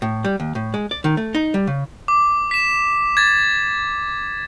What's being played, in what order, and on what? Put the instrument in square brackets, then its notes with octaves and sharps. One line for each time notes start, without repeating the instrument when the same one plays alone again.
[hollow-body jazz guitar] A2
G3
D#2
A2
G#3
D5
D#3
A3
D#4
G3
C#3
[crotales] D6
B6 E7
G#6 A6